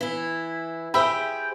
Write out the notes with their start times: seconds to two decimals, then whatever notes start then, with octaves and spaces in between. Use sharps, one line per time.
0.01 E3 E4
0.94 G4 G#4 C5 E5 G5 B5